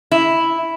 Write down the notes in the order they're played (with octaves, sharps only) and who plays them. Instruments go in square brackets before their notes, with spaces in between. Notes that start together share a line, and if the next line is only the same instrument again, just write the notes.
[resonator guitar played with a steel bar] E4